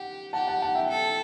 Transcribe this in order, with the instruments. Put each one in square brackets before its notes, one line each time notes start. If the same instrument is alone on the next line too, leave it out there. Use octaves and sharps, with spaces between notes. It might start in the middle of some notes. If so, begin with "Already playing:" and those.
Already playing: [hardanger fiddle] G4 [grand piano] F#5
[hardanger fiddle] G4 [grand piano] F#5 A5
[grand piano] F#5 A5
F#5 A5
E5 G5
[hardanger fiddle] A4